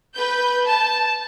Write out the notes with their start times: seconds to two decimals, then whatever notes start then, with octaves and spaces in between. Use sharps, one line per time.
0.13 B4 G6
0.64 A5